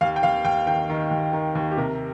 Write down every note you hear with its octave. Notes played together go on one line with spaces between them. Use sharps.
D#2 F5
G5
D#2 F5
D#2 G5
D#3 G5
D#3
D#2
D#3
D#2
G4
C3 A#4